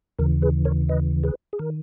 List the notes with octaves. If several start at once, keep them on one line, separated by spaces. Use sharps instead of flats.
D#2 C#3 E3 A#4
G#4 B4
A#4 C#5
B4 D#5
G#4 B4
G#4
D#3 A#4